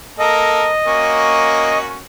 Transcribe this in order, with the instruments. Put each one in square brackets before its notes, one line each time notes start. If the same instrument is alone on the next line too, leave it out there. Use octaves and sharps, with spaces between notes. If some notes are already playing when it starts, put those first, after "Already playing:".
[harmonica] A#3 A4 A#4 [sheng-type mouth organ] D#5
[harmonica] A#3 C#4 F#4